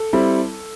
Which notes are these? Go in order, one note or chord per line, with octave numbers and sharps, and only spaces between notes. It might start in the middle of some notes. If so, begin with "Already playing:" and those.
Already playing: A4
G3 C4 E4